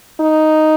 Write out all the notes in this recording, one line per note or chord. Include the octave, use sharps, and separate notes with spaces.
D#4